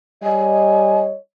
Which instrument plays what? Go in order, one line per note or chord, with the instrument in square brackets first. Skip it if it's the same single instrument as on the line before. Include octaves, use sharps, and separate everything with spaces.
[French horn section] G3 C#5 D#5 [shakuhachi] G#5